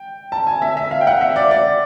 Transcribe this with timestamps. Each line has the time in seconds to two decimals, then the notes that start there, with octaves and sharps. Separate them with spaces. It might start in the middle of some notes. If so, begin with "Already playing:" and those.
Already playing: G5
0.32 A5
0.47 G#5
0.62 E5
0.77 E5
0.91 F5
1.01 G5
1.07 F#5
1.21 E5
1.36 D5
1.51 D5